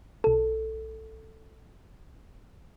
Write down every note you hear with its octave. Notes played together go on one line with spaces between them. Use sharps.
B1 A4